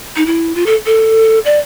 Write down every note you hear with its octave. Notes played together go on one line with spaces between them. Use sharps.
D#4
E4
F4
A4
A4
D5